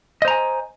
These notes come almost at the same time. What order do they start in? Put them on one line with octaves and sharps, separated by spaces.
D#5 C5 A#5 G#5